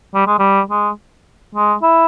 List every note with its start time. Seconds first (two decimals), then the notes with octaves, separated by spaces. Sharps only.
0.14 G3
0.27 G#3
0.39 G3
0.70 G#3
1.55 G#3
1.82 E4